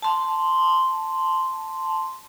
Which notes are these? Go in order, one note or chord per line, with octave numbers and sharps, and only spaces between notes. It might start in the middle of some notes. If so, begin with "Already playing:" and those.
A5 C6